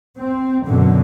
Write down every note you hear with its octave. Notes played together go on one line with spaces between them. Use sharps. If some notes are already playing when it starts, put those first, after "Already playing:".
C4
F#2 B2 D3